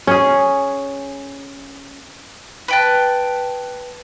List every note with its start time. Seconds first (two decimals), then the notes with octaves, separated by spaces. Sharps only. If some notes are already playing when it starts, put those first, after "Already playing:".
0.07 C#4 G#4
2.68 B4 G5 A5